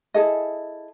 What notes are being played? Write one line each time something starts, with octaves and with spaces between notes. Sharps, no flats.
E4 G#4 A4 D#5